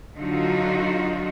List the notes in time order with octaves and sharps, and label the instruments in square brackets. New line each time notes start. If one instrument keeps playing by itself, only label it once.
[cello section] D3 F#3 D#4 F4 F#4